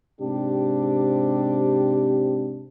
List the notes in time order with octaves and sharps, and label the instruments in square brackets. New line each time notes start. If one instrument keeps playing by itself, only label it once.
[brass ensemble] G#2 C3 C4 D4 G4